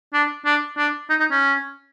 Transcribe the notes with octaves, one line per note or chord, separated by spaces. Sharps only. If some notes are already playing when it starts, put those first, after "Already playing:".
D4
D4
D4
D#4
D#4
C#4